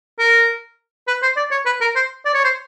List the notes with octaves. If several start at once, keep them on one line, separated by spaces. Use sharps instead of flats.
A#4
B4
C5
D5
C#5
B4
A#4
C5
D5
C#5
C5